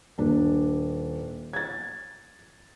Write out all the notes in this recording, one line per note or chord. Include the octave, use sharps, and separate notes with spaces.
D#1 D4
G#6 A6